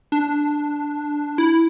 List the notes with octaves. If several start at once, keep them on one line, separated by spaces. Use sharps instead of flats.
D4
E4